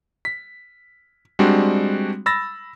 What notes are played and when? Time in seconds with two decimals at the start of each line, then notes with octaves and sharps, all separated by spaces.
0.25 B6
1.39 G3 G#3 C4 D4 F#4
2.26 B5 E6 A6 A#6